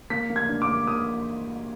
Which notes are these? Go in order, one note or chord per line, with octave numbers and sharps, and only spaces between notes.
A#3 B6
A#3
G#6
D4
D6
A#3
A#3 D#6